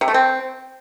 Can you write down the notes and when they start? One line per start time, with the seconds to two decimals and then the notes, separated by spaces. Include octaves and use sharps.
0.01 C3
0.08 A3
0.14 C4